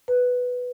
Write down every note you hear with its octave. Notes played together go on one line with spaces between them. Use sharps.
B4